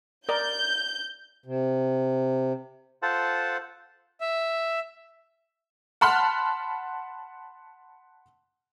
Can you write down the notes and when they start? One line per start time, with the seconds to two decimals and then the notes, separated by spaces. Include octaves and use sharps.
0.29 A#4 D5 G6
1.45 C3
3.03 F4 A4 C5 F#5 A5
4.20 E5
6.01 F#5 A5 B5 C6 F6 F#6